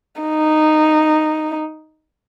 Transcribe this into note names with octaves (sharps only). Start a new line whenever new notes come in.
D#4